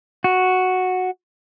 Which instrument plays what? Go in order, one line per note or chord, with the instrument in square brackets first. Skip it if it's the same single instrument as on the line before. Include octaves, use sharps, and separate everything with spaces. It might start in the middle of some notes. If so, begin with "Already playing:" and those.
[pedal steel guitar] F#4